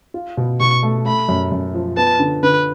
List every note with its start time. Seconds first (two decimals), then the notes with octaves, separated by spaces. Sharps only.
0.14 F4
0.37 B2
0.60 B2 C#6
0.83 A3
1.05 A3 B5
1.29 F#2
1.52 F#2
1.74 F3
1.97 B3 A5
2.20 D3
2.43 D3 B4